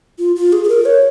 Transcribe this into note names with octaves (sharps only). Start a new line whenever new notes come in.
F4
F4
G#4
G#4
A#4
C#5